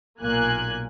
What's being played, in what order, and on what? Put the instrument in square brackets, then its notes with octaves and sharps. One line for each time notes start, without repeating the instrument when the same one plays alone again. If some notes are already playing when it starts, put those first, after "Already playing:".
[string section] B1 A#2 A#3 G#5 F#6